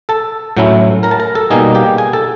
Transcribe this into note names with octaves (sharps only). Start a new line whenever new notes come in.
A4 A5
A2 F#3 A3 C#4 E4
A#4 A#5
A5
A#4 A#5
A4 A5
B2 G3 A#3 D#4 G#4 G#5
G4 G5
G#4 G#5
A4 A5